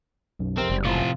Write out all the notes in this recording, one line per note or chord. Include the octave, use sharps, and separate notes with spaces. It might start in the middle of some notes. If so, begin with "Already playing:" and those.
B1 F#2
F2 C3 C4 A#4
F#1 G3
A2 C3 F3 F4